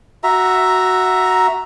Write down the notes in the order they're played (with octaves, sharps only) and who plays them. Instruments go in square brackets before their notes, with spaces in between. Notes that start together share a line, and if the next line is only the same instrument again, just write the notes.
[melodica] F#4 E5 A#5